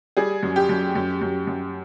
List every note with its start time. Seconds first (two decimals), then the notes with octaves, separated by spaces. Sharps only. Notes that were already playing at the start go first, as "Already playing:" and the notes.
0.17 G3 G#4
0.43 F#2
0.56 G4
0.69 F#2
0.95 F#2
1.22 F#2
1.47 F#2